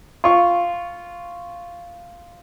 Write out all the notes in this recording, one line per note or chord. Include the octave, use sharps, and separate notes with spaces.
F4 C#6